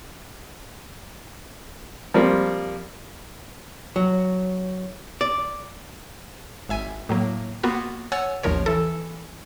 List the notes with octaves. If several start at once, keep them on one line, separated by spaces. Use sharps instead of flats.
F3 G3 A#3 C4
F#3
D5
G#1 E5 G#5
A2 F#3 A#3
A#3 B3 F4 F#4
C#5 F#5 G#5 E6 A6
A1 D#2 F3 A#4 C#5
E3 A4